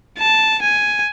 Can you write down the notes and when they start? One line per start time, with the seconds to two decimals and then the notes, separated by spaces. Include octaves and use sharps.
0.18 A5
0.62 G#5